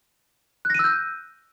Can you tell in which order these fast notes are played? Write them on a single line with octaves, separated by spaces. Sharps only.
F#6 A#6 D#7 E6 G6